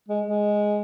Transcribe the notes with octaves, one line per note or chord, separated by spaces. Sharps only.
G#3
G#3